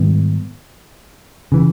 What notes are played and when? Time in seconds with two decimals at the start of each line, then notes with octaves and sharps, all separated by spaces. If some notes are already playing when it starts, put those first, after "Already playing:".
Already playing: G#2 D#3 G3 B3
1.52 C#3 E3